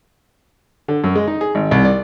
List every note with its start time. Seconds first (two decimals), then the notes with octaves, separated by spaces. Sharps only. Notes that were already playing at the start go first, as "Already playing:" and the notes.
0.88 D3
1.04 F#2
1.15 G#3
1.28 D#4
1.41 G#4
1.55 G#1
1.71 C2
1.85 D5